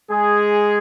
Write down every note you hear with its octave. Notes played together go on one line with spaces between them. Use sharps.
G#3 G#4